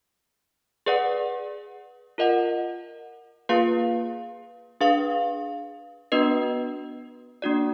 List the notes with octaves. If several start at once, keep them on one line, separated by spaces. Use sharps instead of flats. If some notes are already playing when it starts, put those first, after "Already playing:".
G#4 B4 D5 F#5
F4 A#4 D#5 F#5
A#3 F4 G#4 B4 F5
D4 G#4 B4 F5
B3 D4 F#4 B4 D#5
A#3 D4 F#4 D5